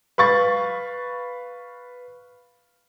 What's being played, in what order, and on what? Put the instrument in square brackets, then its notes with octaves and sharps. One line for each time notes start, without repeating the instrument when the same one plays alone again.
[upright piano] B4 F5 C#6 A6